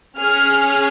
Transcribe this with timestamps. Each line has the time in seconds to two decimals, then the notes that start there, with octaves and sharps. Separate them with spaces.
0.18 C#4 G#4 F6